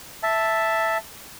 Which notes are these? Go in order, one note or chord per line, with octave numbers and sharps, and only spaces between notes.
E5 A5